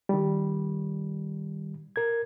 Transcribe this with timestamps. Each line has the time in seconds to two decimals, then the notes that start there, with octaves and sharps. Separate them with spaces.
0.09 D#3 G3
1.96 A#4 G#6